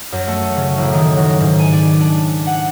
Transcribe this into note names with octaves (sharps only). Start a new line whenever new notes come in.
F#2
A3
C#3
A1
D#3
F#3
G#2
G#5
D5
D4
F#5